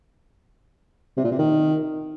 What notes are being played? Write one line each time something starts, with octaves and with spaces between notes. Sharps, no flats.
C3
A#2
C3
D#3